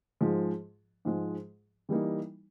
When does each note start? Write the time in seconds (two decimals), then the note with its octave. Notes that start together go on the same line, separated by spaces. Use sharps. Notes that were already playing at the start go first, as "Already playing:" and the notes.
0.21 G#2 F3 G#3
1.05 G#2 F3 G#3
1.89 E3 G3 A#3 D#4